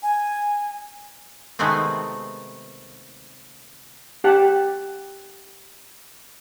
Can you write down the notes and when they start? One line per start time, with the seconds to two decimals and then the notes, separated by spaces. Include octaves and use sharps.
0.02 G#5
1.59 C3 D#3 G#3 A3 B3 C4
4.24 G4 F#5 A5